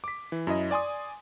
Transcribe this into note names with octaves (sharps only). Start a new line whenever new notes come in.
D6 B6
E3
F#2 E4 D#5
D5 G#5 C6 D#6